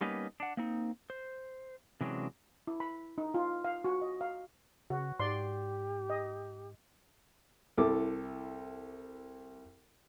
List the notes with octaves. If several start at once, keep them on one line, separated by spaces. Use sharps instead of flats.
G3 A#3 B3 C#4 D#4 B4
D4 F#5
A#3 C4 D#4
C5
C3 E3 F#3 G#3 C#4 D4
E4
B5
D#4
F4
F5
F#4
D#5
F5
C#3 F#4
G#2 G4 D5 C6
D#5
C2 E4 A4 D6